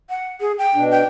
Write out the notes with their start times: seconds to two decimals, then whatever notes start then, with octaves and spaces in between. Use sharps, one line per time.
0.10 F#5
0.41 G#4
0.58 G5
0.75 B2 D4
0.91 G5